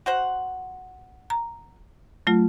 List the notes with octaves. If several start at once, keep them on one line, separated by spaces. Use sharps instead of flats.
F#4 C5 F#5
A#5
F#3 A3 F4